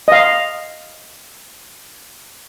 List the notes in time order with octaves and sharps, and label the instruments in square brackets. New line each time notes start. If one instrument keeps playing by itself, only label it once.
[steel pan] D#5 F5